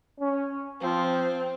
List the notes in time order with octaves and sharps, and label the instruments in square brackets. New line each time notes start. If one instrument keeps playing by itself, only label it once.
[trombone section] C#4
[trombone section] F3 [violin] C4